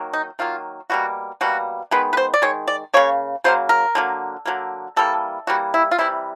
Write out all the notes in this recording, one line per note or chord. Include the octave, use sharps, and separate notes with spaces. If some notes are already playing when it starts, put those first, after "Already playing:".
Already playing: D#3 F#3 A#3
D#4
D#3 F#3 A#3 F4
B2 G3 A#3 F#4
B2 G3 A#3 F#4
D#3 G#3 B3 B4
B4
C5
D5
D#3 G#3 C#5
D5
C#3 F#3 A#3 C#5
C#3 F#3 A#3 C5
A#4
D3 F#3 A#3
D3 F#3 A#3
E3 G3 A#3 A4
E3 G3 A#3 F#4
E4
F4
C3 E3 G3 E4